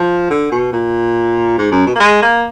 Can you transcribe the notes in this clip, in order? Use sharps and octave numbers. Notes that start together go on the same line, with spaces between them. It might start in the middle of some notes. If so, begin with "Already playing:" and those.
Already playing: F3
D3
B2
A#2
G#2
F#2
B2
A#3
G#3
A#3